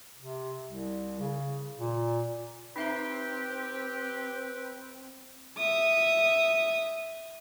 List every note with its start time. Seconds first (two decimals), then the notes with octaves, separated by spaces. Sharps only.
0.18 C3
0.66 C2
1.20 C#3
1.76 A#2
2.76 C4 D#4 G4 B4 E5 G5 A#5
5.58 E5 D#6